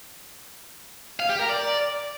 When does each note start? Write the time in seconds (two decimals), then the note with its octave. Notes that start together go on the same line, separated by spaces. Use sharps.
1.20 F5
1.30 G4
1.40 A#4
1.49 D5